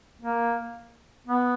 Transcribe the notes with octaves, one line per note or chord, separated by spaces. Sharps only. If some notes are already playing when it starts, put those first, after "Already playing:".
A#3
B3